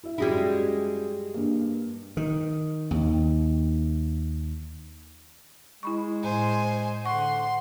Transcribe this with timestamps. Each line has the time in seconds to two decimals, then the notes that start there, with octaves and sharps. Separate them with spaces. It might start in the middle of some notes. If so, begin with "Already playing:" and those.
0.03 E4 E5
0.18 F#2 G3 G#3 E4 F#4
1.34 G2 A#3
2.17 D#3
2.91 D#2
5.83 G#3 E4 B5 C#6
6.24 A2 C5 G#5
7.06 D3 F#5 C6 C#6